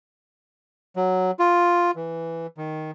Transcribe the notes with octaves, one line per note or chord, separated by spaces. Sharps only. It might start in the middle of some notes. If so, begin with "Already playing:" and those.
F#3
F4
E3
D#3